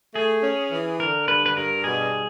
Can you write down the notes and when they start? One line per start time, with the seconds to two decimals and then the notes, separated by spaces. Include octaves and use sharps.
0.15 A3 G#4
0.43 C#4
0.72 E3
1.00 D3 A#4
1.28 G2 B4
1.46 B4
1.56 G2 A#4
1.84 B2 G#4
2.13 B2